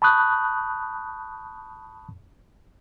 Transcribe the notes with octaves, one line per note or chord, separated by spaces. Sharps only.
A5 B5 C#6 D#6 F#6 G6